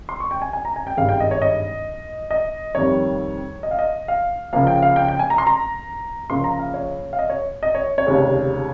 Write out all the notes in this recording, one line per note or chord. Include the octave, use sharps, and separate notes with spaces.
C6
C#6
G5
G#5
G#5
A#5
G#5
G5
G#1 G2 D#3 G#3 F5
G5
D#5
C#5
D#5
D#5
F2 D#3 G3 C#5
D#5
F5
D#5
F5
C#2 C#3 F3 A#3 F5
G5
F5
G5
G5
G#5
A#5
C6
A#5
C#2 C#3 F3 A#3 C6
A#5
F5
C#5
F5
D#5
C#5
D#5
C#5
C#5
F1 D#2 C#3 G#3